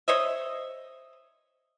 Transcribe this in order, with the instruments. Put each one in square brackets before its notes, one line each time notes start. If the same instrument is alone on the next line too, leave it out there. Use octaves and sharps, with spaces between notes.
[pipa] C5 C#5 D#5 E5